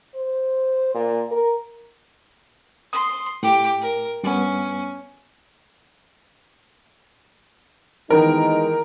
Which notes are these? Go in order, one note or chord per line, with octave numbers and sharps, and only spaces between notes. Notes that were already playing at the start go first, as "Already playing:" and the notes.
C5
A#2
A#4
C6 D#6
A2 G4 G5
A#4
G2 B3 C#4
D#2 D#3 E3 G#3 B3 D#4 A#4